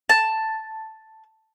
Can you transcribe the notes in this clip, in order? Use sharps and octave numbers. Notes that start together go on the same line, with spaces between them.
A5